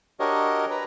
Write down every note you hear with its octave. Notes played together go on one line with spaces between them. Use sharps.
D4 F#4 G4 A#4 C#5 D#5
B4 A#5